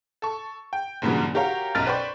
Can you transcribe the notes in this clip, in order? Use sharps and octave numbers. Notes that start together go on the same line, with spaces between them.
A4 C#6
G5
F#1 G2 A#2 C#3 E3 F#3
F#4 G4 A#4 C#5 F5
B1 F#2 A#4 F6 A6
B4 C5 D5 G5 C#6